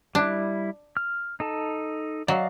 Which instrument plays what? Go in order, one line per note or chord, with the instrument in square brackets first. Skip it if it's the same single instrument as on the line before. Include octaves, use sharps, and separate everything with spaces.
[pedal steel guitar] G3 E4 [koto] D4
[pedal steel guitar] F6
D#4 A4 A5
[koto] F#3 [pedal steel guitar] D5 D#5 F5